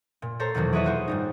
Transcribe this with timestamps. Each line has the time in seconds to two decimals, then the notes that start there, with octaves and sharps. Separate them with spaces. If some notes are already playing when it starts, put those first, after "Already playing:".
0.22 A#2
0.40 A4 C5 C#5 A#5 C6
0.55 E2 B2 D#3 F#3 A#3
0.73 E4 G#4 B4 C#5 D#5 E5
0.84 F4 F#4 C5
1.08 G#2 G3 D#4